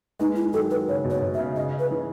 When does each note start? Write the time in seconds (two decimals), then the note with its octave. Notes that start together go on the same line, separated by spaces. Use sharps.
0.20 G#3 B3 D#4
0.36 E4
0.53 D#3 F#3 A4
0.71 B4
0.88 C#3 C#5
1.05 B2
1.10 C#5
1.22 B2
1.34 E5
1.39 C#3
1.56 C#3 D#5
1.79 B4
1.91 C#3 E3